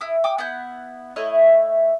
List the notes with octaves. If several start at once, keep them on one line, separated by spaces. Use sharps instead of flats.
E4 D#6
G5 D6 D#6
B3 E4 F#5 G6
A3 E4 C#5 D#5